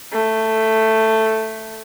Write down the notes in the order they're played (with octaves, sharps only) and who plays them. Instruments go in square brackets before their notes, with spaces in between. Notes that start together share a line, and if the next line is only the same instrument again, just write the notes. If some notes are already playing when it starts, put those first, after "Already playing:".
[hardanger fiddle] A3